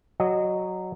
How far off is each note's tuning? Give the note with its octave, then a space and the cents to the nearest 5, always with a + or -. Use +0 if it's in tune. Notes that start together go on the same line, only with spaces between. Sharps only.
F#3 +0 D#5 -20